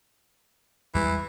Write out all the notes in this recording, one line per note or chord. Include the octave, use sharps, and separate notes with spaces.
E2 E3 G3 G#3